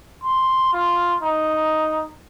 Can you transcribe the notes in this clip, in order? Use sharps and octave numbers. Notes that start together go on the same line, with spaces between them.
C6
F4
D#4